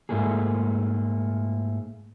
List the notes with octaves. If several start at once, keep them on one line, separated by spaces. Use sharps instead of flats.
G#2 A3 A#3 G#4